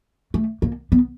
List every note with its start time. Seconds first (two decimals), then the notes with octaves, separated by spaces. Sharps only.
0.34 A3
0.62 A#3
0.92 B3